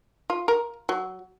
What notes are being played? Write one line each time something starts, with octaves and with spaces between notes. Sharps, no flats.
F4
A#4
F#3